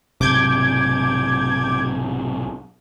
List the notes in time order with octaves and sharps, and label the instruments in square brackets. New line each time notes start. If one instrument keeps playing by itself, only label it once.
[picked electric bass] B1 G#2 C3 [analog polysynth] D6 G6 G#6